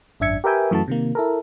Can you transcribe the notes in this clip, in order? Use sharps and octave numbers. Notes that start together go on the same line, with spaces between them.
G#1 F#2 D4 E5 G#6 C#7
G4 A#4 B4 E5 G5 G#5
F#2 E3 A3 F#4 A5
C3 D#3 A#3
E4 A4 A#4